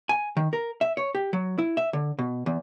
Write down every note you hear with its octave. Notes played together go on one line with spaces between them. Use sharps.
G#5
D#3
A#4
E5
C#5
G4
F#3
E4
E5
D3
B2
E2